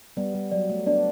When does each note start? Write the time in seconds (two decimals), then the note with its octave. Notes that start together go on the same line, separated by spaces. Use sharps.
0.17 G3 B3 D5
0.34 G3
0.51 F#3 D5
0.70 A3
0.86 B3 D4 D5